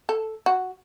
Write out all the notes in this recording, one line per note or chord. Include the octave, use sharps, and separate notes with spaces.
A4
F#4